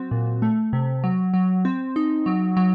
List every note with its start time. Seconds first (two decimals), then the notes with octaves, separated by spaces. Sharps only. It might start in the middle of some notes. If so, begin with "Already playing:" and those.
Already playing: F#3 C4 F#4
0.11 A#2
0.42 A3
0.73 C3
1.04 F#3
1.34 F#3
1.65 C4
1.96 D#4
2.26 F#3
2.57 F#3